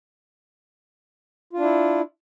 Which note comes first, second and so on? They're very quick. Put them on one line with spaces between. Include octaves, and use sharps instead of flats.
F4 D4 E4